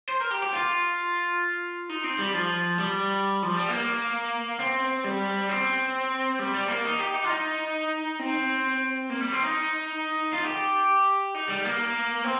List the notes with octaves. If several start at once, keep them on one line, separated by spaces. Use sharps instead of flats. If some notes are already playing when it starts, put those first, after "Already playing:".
C5
A#4
G4
G4
F4
D#4
C4
G3
F3
G3
F3
G3
A#3
C4
G3
C4
G3
G3
A#3
D#4
G4
D#4
F4
D#4
C4
A#3
G3
C4
D#4
F4
G4
D#4
G3
A#3
C4